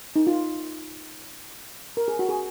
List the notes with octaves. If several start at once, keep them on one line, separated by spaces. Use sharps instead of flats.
D#4
F4
A#4
G#4
F#4
G#4